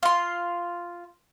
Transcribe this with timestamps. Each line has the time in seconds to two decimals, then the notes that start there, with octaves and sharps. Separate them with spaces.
0.03 F4 C6